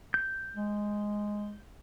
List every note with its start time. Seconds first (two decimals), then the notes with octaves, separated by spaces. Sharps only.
0.14 G6
0.56 G#3